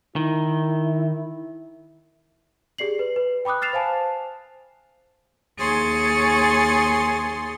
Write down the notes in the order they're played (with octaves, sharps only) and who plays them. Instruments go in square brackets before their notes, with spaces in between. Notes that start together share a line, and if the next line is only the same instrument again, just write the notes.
[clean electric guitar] D#3 [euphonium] E4
[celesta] G4 G#4 D5 C7 F#7
B4
B4
G5 B5 D6 D#6 F#6
F6 A6 C7 E7 F7
C5 F5 G#5 A5
[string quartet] D#2 G#4 C#5 G#5 C6 A6